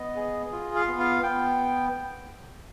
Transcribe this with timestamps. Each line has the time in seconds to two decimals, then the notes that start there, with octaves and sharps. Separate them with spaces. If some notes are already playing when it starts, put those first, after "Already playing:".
Already playing: B3 D#5
0.16 G#4
0.52 F4
0.75 F5
0.88 B3
1.00 F5
1.23 B3 G5